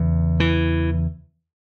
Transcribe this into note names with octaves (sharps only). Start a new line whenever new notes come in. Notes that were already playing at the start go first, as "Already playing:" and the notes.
Already playing: E2 C#3
E3